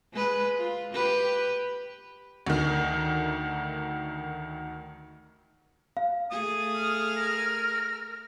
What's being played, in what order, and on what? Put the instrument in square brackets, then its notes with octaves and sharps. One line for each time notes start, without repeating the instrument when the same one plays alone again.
[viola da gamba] G#3 B4
F4
G4 B4
[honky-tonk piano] D2 D#3
[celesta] F5
[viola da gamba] A3 G#4 [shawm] D#6
[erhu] F6
[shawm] A#4